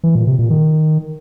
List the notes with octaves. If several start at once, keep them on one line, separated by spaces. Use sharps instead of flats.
E3
A#2
C3
A#2
D#3